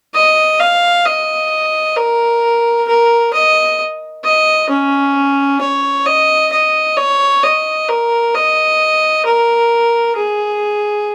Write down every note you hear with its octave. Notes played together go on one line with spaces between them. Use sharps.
D#5
F5
D#5
A#4
A#4
D#5
D#5
C#4
C#5
D#5
D#5
C#5
D#5
A#4
D#5
A#4
G#4